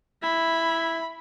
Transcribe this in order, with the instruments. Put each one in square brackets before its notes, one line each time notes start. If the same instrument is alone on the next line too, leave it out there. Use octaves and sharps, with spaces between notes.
[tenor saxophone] E4 [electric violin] B5